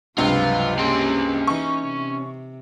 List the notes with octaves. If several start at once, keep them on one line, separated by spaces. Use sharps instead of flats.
C#2 G2 C3 F#3 F4 B4
A#3 C#4 G4 G#4 C6
E3 D#4 C#6
C3